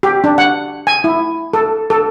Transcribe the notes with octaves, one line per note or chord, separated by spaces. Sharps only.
G4
D4
F#5
G#5
E4
A4
A4